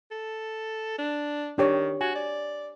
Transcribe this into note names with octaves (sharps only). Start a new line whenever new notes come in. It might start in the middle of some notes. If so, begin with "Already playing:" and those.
A4
D4
D#3 D4 G4 C#5
F#4 G#5
D5